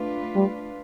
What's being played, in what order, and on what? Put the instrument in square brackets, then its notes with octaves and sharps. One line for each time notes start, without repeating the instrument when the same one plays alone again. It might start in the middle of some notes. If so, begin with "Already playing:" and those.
Already playing: [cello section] A3 D4 F4 B4
[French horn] G3